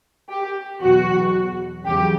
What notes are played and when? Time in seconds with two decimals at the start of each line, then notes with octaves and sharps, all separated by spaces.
0.29 G4
0.81 E2 B2 F#3 F#4
1.86 E2 C#3 F#3 G4